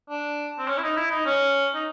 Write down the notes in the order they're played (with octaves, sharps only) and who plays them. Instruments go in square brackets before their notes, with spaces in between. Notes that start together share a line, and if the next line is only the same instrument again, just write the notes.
[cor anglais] D4
C4
C#4
E4
D#4
E4
D#4
C#4
D#4